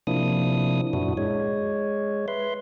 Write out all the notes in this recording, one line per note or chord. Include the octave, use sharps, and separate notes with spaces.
C3 F3 A#3 D4 E4 D#6
F#2 A#2 D4 E4 F#4
G#3 C#5
B4 E5 C6